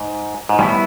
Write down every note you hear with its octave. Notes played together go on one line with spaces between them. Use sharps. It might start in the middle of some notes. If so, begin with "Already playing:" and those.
Already playing: G#2
G#2
A2 G3 B3 E4